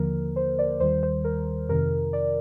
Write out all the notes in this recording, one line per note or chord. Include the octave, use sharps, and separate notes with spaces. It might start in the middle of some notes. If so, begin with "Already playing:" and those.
Already playing: D#2 D3 F3 A#3 A#4
C5
D5
D#2 D#3 G3 C5
C5
A#4
F2 C3 D#3 A#4
D5